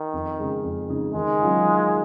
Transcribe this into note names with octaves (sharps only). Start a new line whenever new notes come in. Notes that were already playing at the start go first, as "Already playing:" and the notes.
Already playing: D#3
F2
C#3 G#3 D#4 G#4
F2
C#3 G#3 D#4 G#4
D#3 G#3
F#3 C#4 F4 G#4
D#3